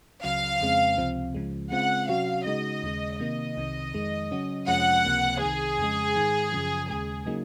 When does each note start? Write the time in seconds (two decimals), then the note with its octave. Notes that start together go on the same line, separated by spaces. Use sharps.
0.24 C#2 C#3 F#3 F5
0.61 F2 C#3 G#3 C4
0.98 C#2 C3 F3 C4
1.35 C#2 C#3 F3 G#3
1.72 C#3 G#3 C4 F4 F#5
2.09 C3 F#3 C#4 F#4 F5
2.46 C#3 G#3 D#4 F#4 D#5
2.83 D#2 C#3 G#3
3.20 C3 D#3 A#3 D#5
3.57 C2 C3 D#3
3.94 F2 D#3 G#3
4.31 C#3 F#3 C#4 F#4
4.68 F2 C3 F3 G#3 C#4 F#5
5.05 C#2 C3 F3 A#3
5.41 C2 C3 D#3 G#4
5.78 F2 C#3 G#3
6.16 G#2 D#3 G#3
6.52 F#2 C#3 F3
6.89 D#2 C#3 G#3 G#4
7.26 C#3 F#3 A#3 D#4